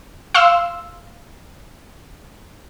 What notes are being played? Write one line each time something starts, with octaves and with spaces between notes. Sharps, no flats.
F5 C6 E6